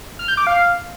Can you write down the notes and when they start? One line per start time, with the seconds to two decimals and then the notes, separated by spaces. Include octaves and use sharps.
0.19 F6
0.28 G6
0.37 D6
0.47 F5